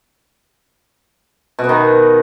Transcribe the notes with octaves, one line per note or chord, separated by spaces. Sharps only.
B2
B3
D#3